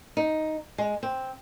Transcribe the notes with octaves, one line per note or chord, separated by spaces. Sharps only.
D#4
G#3
C4